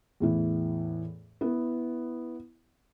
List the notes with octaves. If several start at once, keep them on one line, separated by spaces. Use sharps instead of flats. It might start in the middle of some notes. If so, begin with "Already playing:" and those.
E2 A2 E3
B3 E4